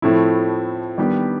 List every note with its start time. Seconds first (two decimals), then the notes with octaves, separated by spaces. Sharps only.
0.02 A2 F3 A3 C4 E4
0.98 D#3 G3 B3 D4 G4